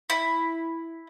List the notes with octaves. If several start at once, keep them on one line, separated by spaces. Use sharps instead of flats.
E4